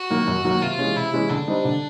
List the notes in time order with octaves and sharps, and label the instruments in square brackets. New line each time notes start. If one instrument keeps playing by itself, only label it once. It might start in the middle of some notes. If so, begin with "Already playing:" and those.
Already playing: [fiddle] F#4
[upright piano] D#3 F#3 A#3
F#2
D#3 F#3 A#3
[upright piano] C3 [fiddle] F4
[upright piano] E3 G#3 C#4
[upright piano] C3 [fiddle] E4
[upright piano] E3 G#3 C#4
[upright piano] D3 [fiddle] D4
[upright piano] G3 C4 D#4
D3